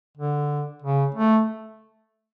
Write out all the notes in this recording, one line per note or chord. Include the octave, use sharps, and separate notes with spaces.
D3
C#3
A3